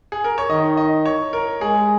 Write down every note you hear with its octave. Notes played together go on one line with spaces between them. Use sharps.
G#4
A#4
C#5
D#3 D#5
D#5
C#5
A#4
G#3 G#4